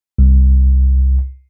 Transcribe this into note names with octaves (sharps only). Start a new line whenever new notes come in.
C2